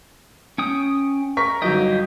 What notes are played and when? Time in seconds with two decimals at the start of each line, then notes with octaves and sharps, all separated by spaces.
0.58 C#4 G5 D#6
1.37 A#4 C#6 B6
1.62 G1 F#3 D#4 D#5 G5